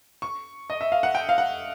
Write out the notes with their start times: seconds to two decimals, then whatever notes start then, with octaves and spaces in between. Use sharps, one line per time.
0.22 C#6
0.70 D#5
0.81 E5
0.92 F5
1.03 F#5
1.15 G5
1.29 F5
1.38 F#5